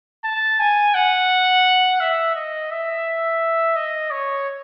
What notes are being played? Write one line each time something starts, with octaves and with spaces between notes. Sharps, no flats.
A5
G#5
F#5
E5
D#5
E5
D#5
C#5